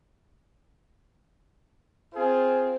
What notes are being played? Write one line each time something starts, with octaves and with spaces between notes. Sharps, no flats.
C4 F4 G#4